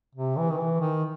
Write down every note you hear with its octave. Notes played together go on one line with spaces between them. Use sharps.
C3
E3
D#3
E3
D#3